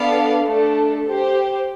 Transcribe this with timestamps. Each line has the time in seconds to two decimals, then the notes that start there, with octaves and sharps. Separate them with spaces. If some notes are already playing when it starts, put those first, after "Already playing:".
Already playing: B3 D4 A4 D5 F5
0.44 A3 D4 A4
1.06 G4 C5